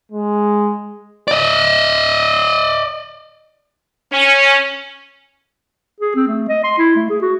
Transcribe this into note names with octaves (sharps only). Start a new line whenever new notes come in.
G#3
D5 D#5
C#4
G#4
C4
A3
D#5
C6
E4
A3
G#4
F#4